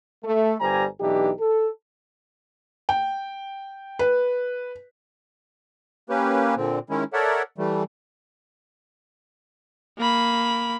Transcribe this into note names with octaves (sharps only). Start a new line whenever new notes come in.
A3
G1 G3 G4 C5 G#5 A#5
B1 E3 D4 D#4 G4
A4
G5
B4
A#3 C#4 G4 B4
A#2 D3 C4
D#3 G#3 C#4 E4
A4 A#4 C#5 D5 E5 F#5
E3 G3 A3
A#3 B5